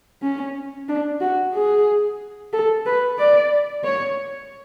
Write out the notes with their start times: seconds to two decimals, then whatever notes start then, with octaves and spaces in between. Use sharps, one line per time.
0.22 C#4
0.89 D4
1.21 F#4
1.54 G#4
2.53 A4
2.86 B4
3.19 D5
3.84 C#5